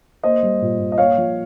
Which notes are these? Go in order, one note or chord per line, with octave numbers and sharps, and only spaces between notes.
A#3 C5 D#5
G3
A#2
A#2
D#5
A#3 C#5 F5
F3